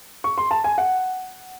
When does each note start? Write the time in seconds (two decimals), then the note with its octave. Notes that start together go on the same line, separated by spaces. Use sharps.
0.24 C#6
0.38 C6
0.51 A5
0.64 G#5
0.78 F#5